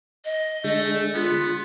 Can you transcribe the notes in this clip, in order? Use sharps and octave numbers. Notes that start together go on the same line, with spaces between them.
D#5
D3 G#3 A3
B3 F4